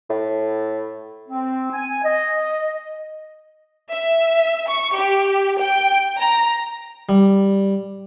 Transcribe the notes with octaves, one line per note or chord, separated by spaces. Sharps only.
A2
C4
G#5
D#5
E5
C#6
G4
G5
A#5
G3